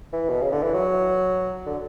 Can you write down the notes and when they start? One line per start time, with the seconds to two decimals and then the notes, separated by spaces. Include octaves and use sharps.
0.13 E3
0.30 B2
0.42 C#3
0.52 D3
0.63 E3
0.74 F#3
1.66 D3